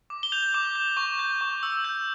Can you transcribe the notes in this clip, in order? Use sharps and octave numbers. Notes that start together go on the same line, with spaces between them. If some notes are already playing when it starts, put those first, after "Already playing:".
D6
G7
G6 F7
D6
G6
C#6
G6
C#6
E6
G6